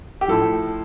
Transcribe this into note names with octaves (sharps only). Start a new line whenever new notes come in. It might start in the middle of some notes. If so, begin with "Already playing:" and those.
G4
A2 F3 A4